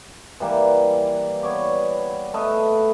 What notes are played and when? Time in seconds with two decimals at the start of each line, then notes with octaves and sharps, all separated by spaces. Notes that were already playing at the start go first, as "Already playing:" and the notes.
0.40 E3 G3 A#3
1.43 B3 C#5 D5 D6
2.34 A3 A4 B4 D#5